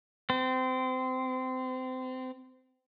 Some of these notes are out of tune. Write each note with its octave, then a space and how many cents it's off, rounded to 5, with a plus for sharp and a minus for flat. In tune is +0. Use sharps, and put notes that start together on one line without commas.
C4 -25